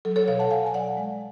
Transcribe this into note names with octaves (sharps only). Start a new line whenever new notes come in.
F#3 A4
A4 C#5
B2 C#5 F5
F#5 A5
B2 F5 G#5
G#5
F#3 D5 F#5
G#3